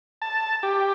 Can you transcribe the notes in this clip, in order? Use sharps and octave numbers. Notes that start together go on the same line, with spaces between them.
A5
G4